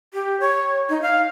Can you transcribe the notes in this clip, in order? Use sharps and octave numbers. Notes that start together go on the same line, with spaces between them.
G4
C#5
D#4
F5